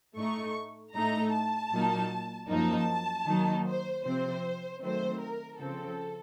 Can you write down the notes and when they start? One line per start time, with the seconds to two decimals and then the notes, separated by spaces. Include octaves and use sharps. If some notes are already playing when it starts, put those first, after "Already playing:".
0.16 A2 A3 D#4 C#6
0.94 A2 A3 D#4 A#5
1.33 A5
1.71 A#2 F#3 A#3 D#4
2.49 F#2 F3 A#3 D#4 A5
3.26 D#3 F#3 A#3 D#4
3.65 C5
4.04 C3 F3 C4 C5
4.82 D#3 F#3 A3 C4 C5
5.20 A#4
5.59 C#3 F3 C4 A4